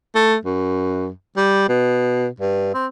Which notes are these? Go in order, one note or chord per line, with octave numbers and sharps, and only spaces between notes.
A3
F#2
G3
B2
G2
C4